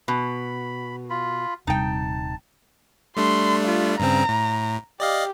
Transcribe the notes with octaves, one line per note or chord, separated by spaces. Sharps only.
B2 B5
F4 B5
D#1 C3 G3 D#4 G5 A5
G3 A3 D4 C6
F4
G2 C#3 C4 A#5
A2
G4 D5 D#5 F5